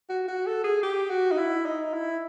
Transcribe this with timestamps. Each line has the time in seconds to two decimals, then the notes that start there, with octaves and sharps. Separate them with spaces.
0.09 F#4
0.28 F#4
0.47 A4
0.64 G#4
0.83 G4
1.10 F#4
1.32 D#4
1.38 E4
1.65 D#4
1.93 E4